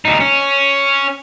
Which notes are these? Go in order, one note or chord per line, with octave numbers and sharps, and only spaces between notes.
D2 D#4
C#4